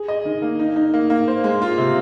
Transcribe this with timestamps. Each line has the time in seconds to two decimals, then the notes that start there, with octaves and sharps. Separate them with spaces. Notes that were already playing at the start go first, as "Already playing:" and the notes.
Already playing: G#4
0.08 D#5
0.25 D#3
0.42 A#3
0.59 D#4
0.76 D#4
0.94 A#3
1.10 A#3
1.28 C5
1.44 G#3
1.62 F4
1.78 C3